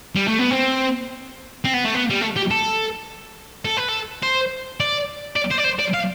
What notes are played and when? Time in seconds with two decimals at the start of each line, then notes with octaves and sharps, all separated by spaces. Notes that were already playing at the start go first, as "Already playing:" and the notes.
0.15 G3
0.27 A3
0.39 B3
0.51 C4
1.65 C4
1.74 B3
1.85 A3
1.94 B3
2.10 G3
2.21 A3
2.36 G4
2.51 A4
3.65 A4
3.77 B4
3.88 A4
4.23 C5
4.80 D5
5.36 D5
5.51 C5
5.58 D5
5.65 C5
5.79 D5
5.94 F5